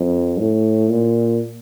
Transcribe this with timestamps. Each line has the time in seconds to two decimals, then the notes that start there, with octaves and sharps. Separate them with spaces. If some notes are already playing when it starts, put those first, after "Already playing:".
Already playing: F2
0.39 A2
0.89 A#2